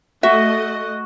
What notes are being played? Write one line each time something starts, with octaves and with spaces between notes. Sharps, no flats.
A3 F#4 D#5 E5